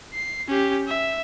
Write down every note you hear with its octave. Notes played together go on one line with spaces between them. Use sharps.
C7
C#4 G4
E5